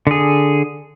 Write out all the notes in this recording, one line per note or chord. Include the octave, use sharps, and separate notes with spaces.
D3 G#4